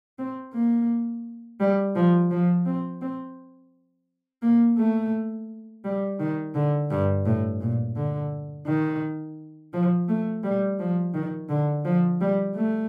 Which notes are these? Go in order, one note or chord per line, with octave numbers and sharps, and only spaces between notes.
C4
A#3
G3
F3
F3
C4
C4
A#3
A3
G3
D#3
D3
G2
A2
A#2
D3
D#3
F3
A3
G3
F3
D#3
D3
F3
G3
A3